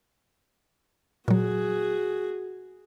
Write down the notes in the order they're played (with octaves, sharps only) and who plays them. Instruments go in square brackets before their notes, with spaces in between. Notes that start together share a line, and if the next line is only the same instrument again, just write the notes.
[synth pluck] A#2 F#3 [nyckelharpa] F#4 G#4